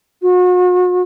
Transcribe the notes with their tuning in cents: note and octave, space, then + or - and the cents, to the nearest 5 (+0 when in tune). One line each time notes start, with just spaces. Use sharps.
F#4 -40